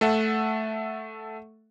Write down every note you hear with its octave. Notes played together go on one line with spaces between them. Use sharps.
A3 A4 E5 F#5